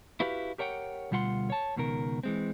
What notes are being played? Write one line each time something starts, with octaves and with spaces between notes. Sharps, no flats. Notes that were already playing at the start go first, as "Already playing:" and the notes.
E4 F#4 G4 B4 F5
G4 A#4 C#5 F#5 G5
D2 B2 G3 F4 F#5 C6
C#5 A5
C#2 B2 D#3 A#4
E3 G#3 C4